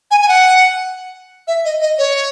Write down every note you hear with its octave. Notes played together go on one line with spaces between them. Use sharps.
G#5
G#5
F#5
E5
D#5
D#5
C#5